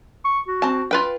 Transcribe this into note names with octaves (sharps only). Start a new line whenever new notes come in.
C#6
F#4
C4 A5
F4 B4 G5